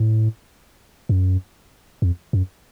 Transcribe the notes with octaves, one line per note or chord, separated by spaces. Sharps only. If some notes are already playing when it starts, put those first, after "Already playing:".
Already playing: A2
F#2
F2
F#2